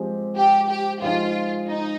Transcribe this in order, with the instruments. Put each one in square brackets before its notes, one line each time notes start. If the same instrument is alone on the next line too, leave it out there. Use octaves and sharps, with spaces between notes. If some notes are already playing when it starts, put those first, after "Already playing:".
Already playing: [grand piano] F3 G#3 C4 G4
[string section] G4
G4
[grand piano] F3 G#3 D#4 [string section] F4
[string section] D#4